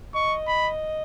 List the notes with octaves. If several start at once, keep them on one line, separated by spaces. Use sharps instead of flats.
D#5 C#6
B5